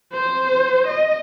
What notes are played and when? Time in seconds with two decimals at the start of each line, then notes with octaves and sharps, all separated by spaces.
0.13 C5
0.88 D#5